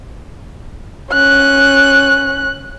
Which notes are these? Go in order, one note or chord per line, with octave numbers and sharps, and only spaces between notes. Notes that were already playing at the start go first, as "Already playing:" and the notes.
C#4 F#6